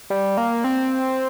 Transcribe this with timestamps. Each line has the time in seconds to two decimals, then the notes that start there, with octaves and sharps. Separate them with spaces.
0.10 G3
0.37 A#3
0.64 C4